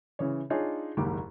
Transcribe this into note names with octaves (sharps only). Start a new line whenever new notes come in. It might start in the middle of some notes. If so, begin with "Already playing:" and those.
C#3 E3 C#5
D4 D#4 F4 G#4 C#5
F#1 D#2 G#2 G4 D6